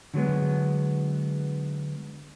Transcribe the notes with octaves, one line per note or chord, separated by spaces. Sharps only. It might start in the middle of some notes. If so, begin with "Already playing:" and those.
D3 F#3 G#3 B3